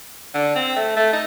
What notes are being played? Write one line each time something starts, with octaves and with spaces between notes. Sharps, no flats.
D3
C4
A3
A3
D#4